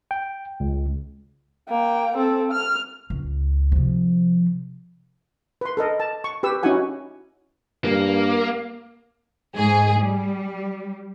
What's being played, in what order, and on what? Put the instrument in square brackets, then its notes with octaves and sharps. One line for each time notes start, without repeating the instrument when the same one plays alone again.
[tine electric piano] G5
C#2
[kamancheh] A#3 G5
C4 A4
F6
[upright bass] C#2
C3 F3
[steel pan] B4 C6
A4 A#4 D#5
A5
C#6
G4 B4 E6
C#4 D#4 E4 F#4 F#5 G#5
[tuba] G2 [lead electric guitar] A#3
[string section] G#2 G#4
G3